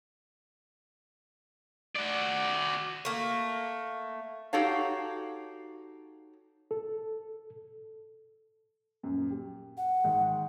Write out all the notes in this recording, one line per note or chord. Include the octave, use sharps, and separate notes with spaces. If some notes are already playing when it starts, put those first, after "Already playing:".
F#4 D5
A3 A#3
D#4 F#4 G4 A4 C#5 F5
A4
D#1 F#2
G4
F#5
G#2 D#3